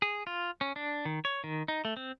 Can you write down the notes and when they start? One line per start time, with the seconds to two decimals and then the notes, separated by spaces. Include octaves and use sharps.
0.02 G#4
0.27 F4
0.61 C#4
0.76 D4
1.05 D#3
1.25 C#5
1.44 D#3
1.68 D#4
1.85 A3
1.97 C4